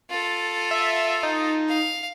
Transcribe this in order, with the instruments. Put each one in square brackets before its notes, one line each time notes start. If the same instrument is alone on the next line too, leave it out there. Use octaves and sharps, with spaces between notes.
[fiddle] F4 A4
[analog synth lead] E5
D#4
[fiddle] F5